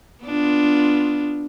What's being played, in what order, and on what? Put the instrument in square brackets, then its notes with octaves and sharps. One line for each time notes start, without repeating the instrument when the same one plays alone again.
[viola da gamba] B3 D4 F4